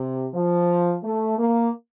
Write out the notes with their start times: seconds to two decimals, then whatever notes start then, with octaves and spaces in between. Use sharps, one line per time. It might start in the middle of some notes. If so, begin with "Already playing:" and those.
Already playing: C3
0.34 F3
1.04 A3
1.39 A#3